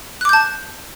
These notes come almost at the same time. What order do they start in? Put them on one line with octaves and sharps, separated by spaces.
F#6 D6 G6 A5